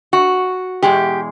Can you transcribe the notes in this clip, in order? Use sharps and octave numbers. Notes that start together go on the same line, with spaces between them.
F#4
E2 B2 G#3 G4